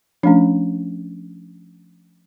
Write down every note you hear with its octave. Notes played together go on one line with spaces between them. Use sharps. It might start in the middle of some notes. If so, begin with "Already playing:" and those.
F3 A3 C#4 D4